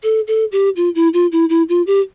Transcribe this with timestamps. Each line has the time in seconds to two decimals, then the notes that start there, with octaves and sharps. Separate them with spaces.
0.03 A4
0.27 A4
0.52 G4
0.77 F4
0.95 E4
1.14 F4
1.32 E4
1.49 E4
1.69 F4
1.87 G4